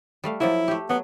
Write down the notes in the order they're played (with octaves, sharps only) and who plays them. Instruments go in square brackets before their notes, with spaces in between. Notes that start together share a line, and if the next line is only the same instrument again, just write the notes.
[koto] G3 A3 F5
[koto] F3 F#3 A#3 [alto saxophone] E4
[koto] A3 G4
[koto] F#3 [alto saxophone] B3